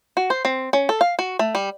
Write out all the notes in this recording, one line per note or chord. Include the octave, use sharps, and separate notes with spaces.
F#4
C5
C4
C#4
A4
F5
F#4
A3
G3